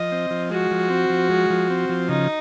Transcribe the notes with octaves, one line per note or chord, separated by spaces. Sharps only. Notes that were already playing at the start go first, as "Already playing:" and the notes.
Already playing: F3 D#5
C4
F3
G#3 F#4
F3
C4
F3
G#3
F3
C4
F3
C#3 D#4